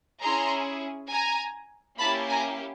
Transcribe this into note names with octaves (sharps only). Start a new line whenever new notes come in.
C#4 E4 G#4 A#5 C6
G#5 A#5
A#3 C#4 E4 G4 A5 B5
G#5 A#5